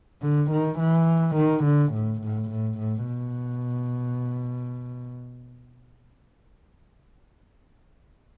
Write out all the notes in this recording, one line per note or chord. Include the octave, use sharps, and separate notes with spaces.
D3
D#3
E3
D#3
D3
A2
A2
A2
A2
B2